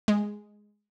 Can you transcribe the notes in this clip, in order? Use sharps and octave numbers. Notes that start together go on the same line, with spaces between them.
G#3